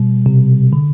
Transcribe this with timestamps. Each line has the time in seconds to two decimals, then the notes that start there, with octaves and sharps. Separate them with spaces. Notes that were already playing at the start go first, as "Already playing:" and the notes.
Already playing: B2 G3
0.26 C3
0.73 D3